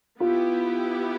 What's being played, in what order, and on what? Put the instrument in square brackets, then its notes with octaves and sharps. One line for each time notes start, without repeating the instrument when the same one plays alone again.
[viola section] B3 E4 G4 [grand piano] F4